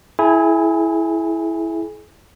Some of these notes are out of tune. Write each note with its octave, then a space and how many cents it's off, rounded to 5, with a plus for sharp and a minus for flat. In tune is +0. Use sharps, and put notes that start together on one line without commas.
E4 +0 G#4 +45 G#5 -25